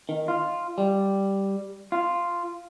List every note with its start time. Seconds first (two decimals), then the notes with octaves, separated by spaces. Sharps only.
0.09 D#3
0.28 F4
0.78 G3
1.92 F4